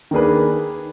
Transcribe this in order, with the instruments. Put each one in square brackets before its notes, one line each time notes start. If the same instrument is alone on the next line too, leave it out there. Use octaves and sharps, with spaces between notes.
[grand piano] D#3 A#3 D4 G#4 B4